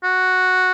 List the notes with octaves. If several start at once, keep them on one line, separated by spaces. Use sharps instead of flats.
F#4